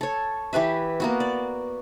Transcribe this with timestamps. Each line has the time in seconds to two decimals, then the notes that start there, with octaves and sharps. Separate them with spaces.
0.01 A4 C#5
0.53 E3 G4 B4 E5
1.00 A#3 B3 F#4
1.20 D5